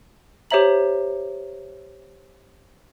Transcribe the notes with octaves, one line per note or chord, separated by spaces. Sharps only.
G4 C5 C#5 E5 A#5 F#7